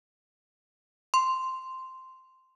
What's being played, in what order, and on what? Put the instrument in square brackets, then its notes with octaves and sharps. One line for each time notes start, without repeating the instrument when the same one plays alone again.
[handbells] C6